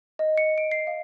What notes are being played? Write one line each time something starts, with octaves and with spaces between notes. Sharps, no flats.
D#5
C#7
D7
C7
F5